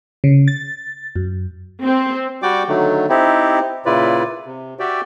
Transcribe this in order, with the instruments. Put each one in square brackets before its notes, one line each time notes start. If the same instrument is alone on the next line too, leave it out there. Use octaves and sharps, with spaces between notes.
[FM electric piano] C#3
A6
F#2
[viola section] C4
[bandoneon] G3 F#4 D5 G5 D6
D3 D#3 F#3 A3
C4 D#4 E4 G4
A#2 C#3 E4 F4 B4 D5
C3
F#4 G4 D5 E5 G5